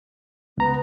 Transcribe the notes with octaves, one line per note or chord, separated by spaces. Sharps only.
C#2 B3 A#5